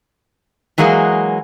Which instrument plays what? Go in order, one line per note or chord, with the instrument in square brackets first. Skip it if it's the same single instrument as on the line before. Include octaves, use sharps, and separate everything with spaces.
[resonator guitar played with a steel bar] E3 F#3 G#3 A#3 G#4